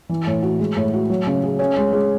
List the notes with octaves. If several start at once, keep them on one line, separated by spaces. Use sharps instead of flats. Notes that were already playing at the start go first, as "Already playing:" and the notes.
E3
A2
F#4
G#3
A2
F#4
F#3
C#3
G#4
C#4
G#3
G#3